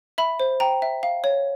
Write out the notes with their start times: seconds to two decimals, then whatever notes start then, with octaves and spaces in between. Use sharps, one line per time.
0.18 E5 B5
0.40 C5
0.60 G5 A#5
0.82 E5
1.03 F5
1.24 C#5